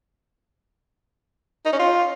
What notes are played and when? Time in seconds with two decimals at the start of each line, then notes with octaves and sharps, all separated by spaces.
1.66 D#4
1.72 C#4
1.79 F4